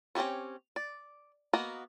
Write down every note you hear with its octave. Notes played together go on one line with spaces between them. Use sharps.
C4 C#4 E4 G4 C#5
D5
A#3 B3 F#4 A#4 D#5